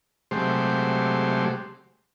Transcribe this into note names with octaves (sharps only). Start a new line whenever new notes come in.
C3 F#3 G#3 A3 G4 C5